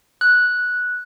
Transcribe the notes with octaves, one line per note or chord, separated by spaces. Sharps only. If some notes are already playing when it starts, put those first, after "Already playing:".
F#6